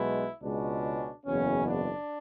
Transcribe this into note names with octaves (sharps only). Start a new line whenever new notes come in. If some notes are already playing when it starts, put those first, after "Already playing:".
Already playing: B1 B2 G#3 B3 E4
C#2 B2 G#3 C#4 D4
F#1 E2 B2 C#4
D4